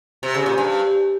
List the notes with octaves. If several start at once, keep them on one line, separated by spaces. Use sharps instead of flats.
C3
C#3
A#2
G2